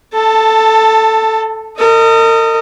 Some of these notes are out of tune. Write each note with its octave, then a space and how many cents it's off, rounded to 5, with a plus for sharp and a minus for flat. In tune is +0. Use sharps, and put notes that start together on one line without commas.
A4 +0 A5 +20
A#4 -40 D#5 +0